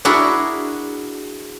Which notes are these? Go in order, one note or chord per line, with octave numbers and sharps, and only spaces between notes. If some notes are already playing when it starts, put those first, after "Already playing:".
D4 E4 F#4 G#4 A#4